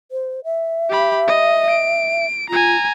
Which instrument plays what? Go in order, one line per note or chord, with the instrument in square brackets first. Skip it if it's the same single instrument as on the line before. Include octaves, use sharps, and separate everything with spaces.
[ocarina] C5
E5
[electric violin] G4 B5
D#5
D7
[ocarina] F4 [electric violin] G#5 A#5